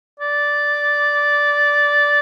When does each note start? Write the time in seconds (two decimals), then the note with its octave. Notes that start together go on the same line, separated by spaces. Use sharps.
0.19 D5